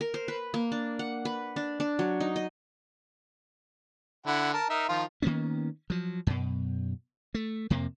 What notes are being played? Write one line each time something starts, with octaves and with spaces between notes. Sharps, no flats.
A#4
C5
B4
A#3
D4
F#5
B4
D4
D4
F#3
D#4
D#5
D3 E4 F#5
A#4 A5
D#4 A#4 E5
D#3 F3 F4
D#3 A#3 B3 C#4
F3 F#3
F#2 B2
A3
F2 C3 A#3